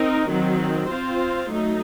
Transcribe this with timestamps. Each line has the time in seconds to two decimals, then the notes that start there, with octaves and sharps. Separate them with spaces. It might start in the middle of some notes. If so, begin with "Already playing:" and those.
Already playing: C4 D#4 A#4
0.29 D#3 F#3 C4
0.89 C4 F4 C5
1.50 F#3 A3 D#4